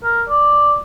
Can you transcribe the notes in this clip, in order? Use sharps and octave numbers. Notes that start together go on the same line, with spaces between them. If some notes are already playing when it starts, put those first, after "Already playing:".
A#4
D5